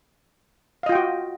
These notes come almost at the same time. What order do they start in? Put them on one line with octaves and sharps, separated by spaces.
F5 D#5 F4 G5 F#4